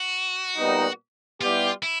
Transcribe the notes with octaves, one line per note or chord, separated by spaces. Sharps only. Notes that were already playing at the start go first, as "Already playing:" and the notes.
Already playing: F#4
A#2 G3 B3 D#4
G3 B3 E4 F4 G4
E4